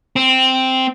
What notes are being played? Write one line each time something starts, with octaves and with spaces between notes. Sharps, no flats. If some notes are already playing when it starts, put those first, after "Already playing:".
C4